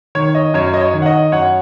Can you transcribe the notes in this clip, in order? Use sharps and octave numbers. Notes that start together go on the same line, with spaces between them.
D#3 C#5
D#5
F#2 C#5
D#5
C#5
D#3
F#5
D#5
F#2 C#5 F#5